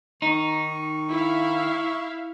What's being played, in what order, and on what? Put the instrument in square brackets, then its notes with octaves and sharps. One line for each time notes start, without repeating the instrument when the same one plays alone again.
[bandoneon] D#3 [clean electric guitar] D#4 [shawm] C#6
[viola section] E4 E5 F5